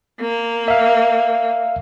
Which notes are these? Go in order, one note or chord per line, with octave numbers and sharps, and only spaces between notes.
A#3
E5 F5